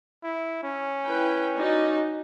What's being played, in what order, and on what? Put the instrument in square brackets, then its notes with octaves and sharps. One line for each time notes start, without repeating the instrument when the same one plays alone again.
[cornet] E4
C#4
[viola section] E4 B4 G5
D#4 F#4 D5